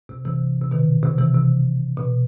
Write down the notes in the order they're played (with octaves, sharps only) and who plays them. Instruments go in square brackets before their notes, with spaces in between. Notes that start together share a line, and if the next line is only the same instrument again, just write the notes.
[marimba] C3
C3 E3
C3
B2 D#3
C3
C3 E3
C3
B2